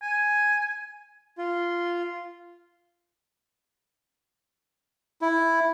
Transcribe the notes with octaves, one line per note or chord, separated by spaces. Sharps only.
G#5
F4
E4